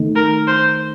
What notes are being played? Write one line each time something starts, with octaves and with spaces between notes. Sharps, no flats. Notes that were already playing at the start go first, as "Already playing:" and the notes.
Already playing: D#3 A3 D#4
A#4
C5